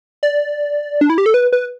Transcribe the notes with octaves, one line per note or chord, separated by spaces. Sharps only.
D5
D4
E4
G4
A4
B4
B4